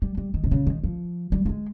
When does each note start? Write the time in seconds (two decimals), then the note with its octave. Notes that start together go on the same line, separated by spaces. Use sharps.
0.02 G3
0.17 G3
0.34 D#3
0.44 C3
0.51 C#3
0.67 D#3
0.84 F3
1.32 G3
1.46 A#3
1.49 G#3